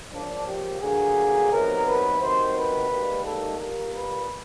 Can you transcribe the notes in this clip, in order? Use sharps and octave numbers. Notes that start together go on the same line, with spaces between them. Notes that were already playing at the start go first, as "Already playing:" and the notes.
C#3 F3 A#3 D4
G4
G2 D3 F#3 A#3 G#4
C3 D#3 F#3 B3 A#4
B4
C3 D#3 F#3 C5
B4
G#2 D#3 G3 A#3
A4
A#2 G3 A#3 A#4
B4